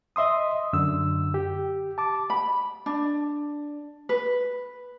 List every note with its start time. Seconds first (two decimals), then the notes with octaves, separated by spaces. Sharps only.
0.16 D#5 E5 C6 D#6
0.73 F#2 D3 E6
1.34 G4
1.98 A5 D6
2.30 B5
2.86 D4
4.09 B4